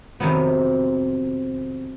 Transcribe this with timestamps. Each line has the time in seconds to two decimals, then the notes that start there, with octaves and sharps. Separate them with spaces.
0.20 F2 C3 D#3 F#3 B3